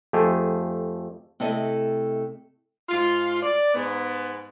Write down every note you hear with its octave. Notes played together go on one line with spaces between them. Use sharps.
F2 A3 G4 G#4
C3 A3 E4 A4 D#5
G#2 F4
D5
G#2 B3